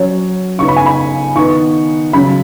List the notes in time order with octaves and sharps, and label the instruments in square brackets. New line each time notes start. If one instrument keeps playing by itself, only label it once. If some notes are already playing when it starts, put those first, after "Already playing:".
Already playing: [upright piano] F#3 C#4 C#5
C#3 B3 D#4 C#6
B5
G#5
B5
D#3 B3 D#4 C#6
C#3 F#3 C#4 B5